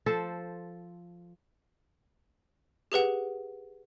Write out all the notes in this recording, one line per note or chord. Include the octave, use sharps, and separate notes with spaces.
F3 A4 C5
G4 G#4 B4 F#5